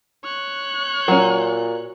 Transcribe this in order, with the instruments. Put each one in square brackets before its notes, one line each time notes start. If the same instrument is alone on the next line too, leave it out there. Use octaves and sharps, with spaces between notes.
[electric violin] C#5 F#6
[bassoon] A#2 [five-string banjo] F#3 C#4